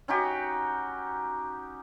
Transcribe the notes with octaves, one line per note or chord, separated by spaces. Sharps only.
C#4 D#4 F#4 G4